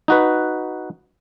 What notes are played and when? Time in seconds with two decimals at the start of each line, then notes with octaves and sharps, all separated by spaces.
0.08 D#4 F#4 B4